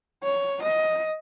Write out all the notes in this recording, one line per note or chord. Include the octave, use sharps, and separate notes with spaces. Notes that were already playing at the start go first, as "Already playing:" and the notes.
C#5
D#5